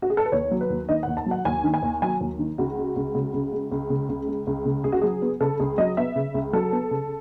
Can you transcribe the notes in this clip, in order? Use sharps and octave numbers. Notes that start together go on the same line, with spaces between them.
F#4
G#4
A4
B4
D#2 C#5
F#3
B4
D#2
D#3 D#5
D#2 F#5
A5
F#3 F#5
D#2 G#5
D#3
G#5
D#2
F#3 G#5
D#2
D#3
C#2 F#4
G#3
C#2
C#3
C#2
G#3
C#2
C#3
C#2
G#3
C#2
C#3
C#2 G#4
F#4
F#3 G#4
B3
C#3 A4
C#2 G#4
F#3 D#5
B3 E5
C#3
C#2
F#3 A4
B3
C#3